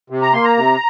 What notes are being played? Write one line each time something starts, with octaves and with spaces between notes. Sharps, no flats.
C3
A#5
A#3 C6
A#5
C3